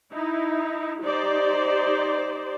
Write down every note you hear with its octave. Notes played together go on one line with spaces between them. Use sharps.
D#4 E4
D#4 G4 C5 D5